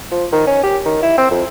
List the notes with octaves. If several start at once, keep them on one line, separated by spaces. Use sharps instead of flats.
F3
D#3
C#4
G4
D#3
E4
C4
F2